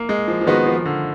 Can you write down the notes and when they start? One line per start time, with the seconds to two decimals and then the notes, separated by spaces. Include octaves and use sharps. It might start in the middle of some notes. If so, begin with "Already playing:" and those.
Already playing: A#3
0.09 G#3
0.28 F3
0.41 F3
0.46 D#3 G#3 B3 D#4 F#4
0.66 F3
0.86 D3